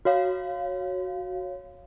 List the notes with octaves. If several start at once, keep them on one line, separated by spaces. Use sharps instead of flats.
F#4 C#5 F5